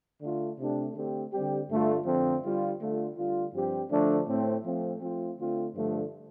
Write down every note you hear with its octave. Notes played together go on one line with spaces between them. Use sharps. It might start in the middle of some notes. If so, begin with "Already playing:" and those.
D3 A3 F4
C3 A3 D4 G4
D3 A3 C4 G4
D3 G3 C4 G4
G2 D3 A3 F4
F2 D3 F3 C4
D3 G3 F4
D3 A3 F4
D3 G3 F4
G2 F3 C4 G4
D3 F3 A3 D4
A2 A3 C4
F3 A3 C4
F3 A3 C4 F4
D3 A3 C4 F4
G2 D3 F3 A3